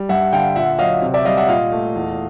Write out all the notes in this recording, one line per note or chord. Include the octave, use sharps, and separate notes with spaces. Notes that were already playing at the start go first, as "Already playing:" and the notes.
Already playing: G3
G2 E5 F#5
D3 F5 G5
A#2 E5 F#5
F#3 D#5 F5
C3
D5 E5
G3 D#5 F5
E5 F#5
A#2 D#5 F5
A3
E2